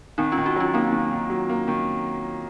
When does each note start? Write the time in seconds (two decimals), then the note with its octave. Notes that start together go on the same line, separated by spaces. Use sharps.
0.18 D#3 C4 D#4
0.32 C#4 F4
0.38 D#3
0.46 D#4 F#4
0.56 F#3 C#4 F4
0.74 A#3 C4 D#4
0.92 D#3
1.11 D#3
1.30 F#3
1.49 A#3
1.68 D#3